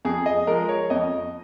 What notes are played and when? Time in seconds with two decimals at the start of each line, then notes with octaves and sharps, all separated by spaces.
0.05 F2 G#4
0.26 D#5
0.47 F3 G#3 A#4
0.69 C#5
0.90 F2 D#5